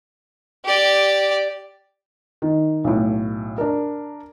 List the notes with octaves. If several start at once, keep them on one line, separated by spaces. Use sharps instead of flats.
G4 D5
D#3
B1 A2
D4 A#4